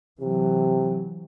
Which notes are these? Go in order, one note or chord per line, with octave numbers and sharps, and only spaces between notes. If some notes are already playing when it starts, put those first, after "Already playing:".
C3 E3 F#3